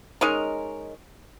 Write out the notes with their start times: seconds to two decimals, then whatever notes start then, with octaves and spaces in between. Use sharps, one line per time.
0.21 G#3 C#4 D#4 A#4